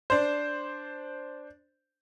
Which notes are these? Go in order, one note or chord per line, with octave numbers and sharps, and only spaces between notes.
D4 C5